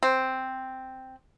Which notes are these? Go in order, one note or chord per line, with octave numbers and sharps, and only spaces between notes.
C4